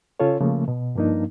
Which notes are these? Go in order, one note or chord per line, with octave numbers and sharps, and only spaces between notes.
C#3 C#4 F4 A4 C#5
C#3 F3 A3 A#3
B2
G2 F3 A#3 D4 D#4